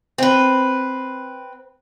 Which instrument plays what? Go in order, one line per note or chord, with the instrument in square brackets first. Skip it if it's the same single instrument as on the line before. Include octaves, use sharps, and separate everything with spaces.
[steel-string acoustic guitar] C4 B4